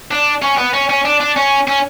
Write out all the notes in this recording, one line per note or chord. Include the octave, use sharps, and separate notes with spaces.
D4
C#4
B3
C#4
C#4
D4
D4
C#4
C#4